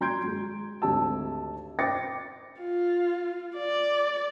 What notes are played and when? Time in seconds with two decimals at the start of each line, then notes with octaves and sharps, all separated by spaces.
0.01 F#3 A#5 C6 G6 G#6 D7
0.23 F#3 G#3
0.82 G#1 D2 G4 A5 E6
1.79 C5 G5 D6 A6 A#6 C#7
2.60 F4
3.57 D5